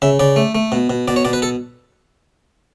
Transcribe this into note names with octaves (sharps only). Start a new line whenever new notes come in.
C#3 E5
C#3 D5
A3
A3
B2
B2
B2 D5
C#5
B2 D5
B4
A4